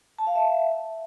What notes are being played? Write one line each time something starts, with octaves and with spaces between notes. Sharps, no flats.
A5
F5
E5